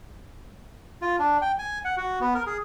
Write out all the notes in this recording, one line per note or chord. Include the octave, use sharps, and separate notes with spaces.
F4
D4
G5
G#5
F#5
F#4
B3
A#4
G#4